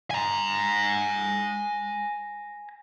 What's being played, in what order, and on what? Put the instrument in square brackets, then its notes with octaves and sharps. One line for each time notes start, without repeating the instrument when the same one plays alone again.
[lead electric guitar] G#5 A#5